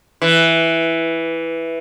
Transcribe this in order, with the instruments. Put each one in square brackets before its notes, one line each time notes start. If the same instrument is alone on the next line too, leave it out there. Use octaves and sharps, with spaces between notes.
[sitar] E3